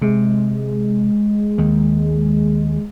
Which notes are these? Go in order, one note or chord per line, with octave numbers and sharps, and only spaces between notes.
C3 G#3
D#2 D#3